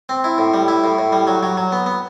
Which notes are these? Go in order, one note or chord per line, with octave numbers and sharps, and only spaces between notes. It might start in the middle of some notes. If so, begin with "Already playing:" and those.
C4
E4
A2
G3
E4
A2
A2
G3
F#3
F#3
F#3
B3
B3